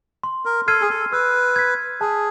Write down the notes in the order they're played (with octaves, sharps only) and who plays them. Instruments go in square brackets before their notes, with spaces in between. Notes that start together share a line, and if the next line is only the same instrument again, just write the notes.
[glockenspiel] C6
[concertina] A#4
[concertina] A4 [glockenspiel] F6 G#6 C7 D#7
[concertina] G#4
A4
[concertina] B4 [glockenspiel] E6
[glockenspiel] G#6 B6
[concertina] G#4 [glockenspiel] A5